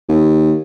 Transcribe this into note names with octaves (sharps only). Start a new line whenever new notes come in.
D#2